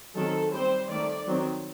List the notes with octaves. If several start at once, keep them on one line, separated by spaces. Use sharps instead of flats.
D#3 F#3 C4 A4
G3 C4 C5
D#3 A3 C4 D5
D#3 F#3 C4